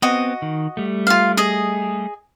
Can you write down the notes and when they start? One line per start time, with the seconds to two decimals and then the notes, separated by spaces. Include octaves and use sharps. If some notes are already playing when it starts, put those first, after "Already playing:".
0.02 B3 C4 F#4 D#5
0.42 D#3
0.77 G3 A3
1.07 F4 F5
1.37 G#4 D#5